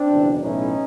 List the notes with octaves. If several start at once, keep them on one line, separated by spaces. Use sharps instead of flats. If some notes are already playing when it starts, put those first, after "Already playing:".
Already playing: C4 D4
F#1 E2 B2
B1 A2 E3 C#4 D#4